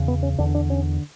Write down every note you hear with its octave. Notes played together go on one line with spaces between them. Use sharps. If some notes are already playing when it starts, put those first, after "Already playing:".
Already playing: E2 C#3
B3
C#4
E2 D3 D4
D4
C#4